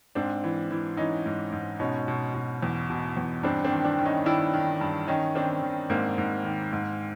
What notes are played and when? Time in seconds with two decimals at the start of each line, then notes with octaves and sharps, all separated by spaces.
0.15 G#2 C4 D4
0.44 E3
0.71 E3
0.97 E3 C#4 D#4
1.26 G#2
1.52 G#2
1.79 B2 C#4 D#4
2.08 B2
2.34 B2
2.63 E2
2.90 B2
3.17 E2
3.43 G2 C4 D4
3.64 C4 D4
3.71 D#3
3.85 C4 D4
3.98 D#3
4.05 C#4 D#4
4.26 D#3 D4 E4
4.54 D#3
4.81 G2
5.07 D#3 C#4 D#4
5.35 D#3 C4 D4
5.62 D#3
5.90 G#2 A#3 C4
6.18 G#2
6.44 D#3
6.73 G#2